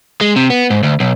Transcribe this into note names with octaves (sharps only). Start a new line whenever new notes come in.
G#3
C3
B3
G#2
D2
B1